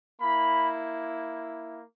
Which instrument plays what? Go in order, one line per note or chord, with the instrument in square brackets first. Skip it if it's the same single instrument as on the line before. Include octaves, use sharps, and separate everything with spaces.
[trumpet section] A#3 E4 B5